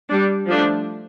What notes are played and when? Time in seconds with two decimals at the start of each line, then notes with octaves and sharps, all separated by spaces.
0.09 G3 D4
0.46 F3 A3 D4